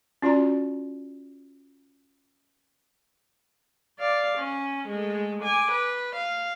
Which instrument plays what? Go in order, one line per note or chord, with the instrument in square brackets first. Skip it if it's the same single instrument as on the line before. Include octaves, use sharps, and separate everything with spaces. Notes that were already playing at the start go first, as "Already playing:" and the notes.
[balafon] C#4 F4 F#4 D5 A#5
[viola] D5 F5
C#4
G#3 A3
G#5 D6
B4
F5